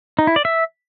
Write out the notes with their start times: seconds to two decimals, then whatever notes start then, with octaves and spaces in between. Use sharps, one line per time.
0.19 D#4
0.27 E4
0.36 D5
0.45 E5